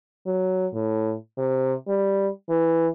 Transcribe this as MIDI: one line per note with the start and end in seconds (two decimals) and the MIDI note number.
0.27 0.67 54
0.73 1.14 45
1.38 1.73 48
1.88 2.29 55
2.49 2.88 52